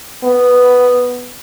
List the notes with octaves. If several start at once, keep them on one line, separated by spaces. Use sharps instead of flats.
B3